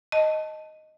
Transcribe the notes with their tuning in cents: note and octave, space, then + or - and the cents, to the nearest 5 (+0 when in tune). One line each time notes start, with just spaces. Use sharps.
D#5 +0 A5 +0